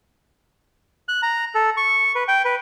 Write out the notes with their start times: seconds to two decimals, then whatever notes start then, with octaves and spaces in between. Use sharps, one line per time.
1.08 F#6
1.22 A#5
1.55 A4
1.77 C#6
2.15 B4
2.28 G5
2.45 B4